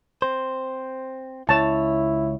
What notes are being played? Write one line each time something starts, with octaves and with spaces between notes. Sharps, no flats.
C4 C5
C#2 E4 C#5 A5